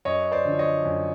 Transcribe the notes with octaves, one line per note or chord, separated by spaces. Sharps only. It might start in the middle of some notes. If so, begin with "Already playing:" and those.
F#2 C#5 D#5
C5 D5
D3 F3
C#5 D#5
F#2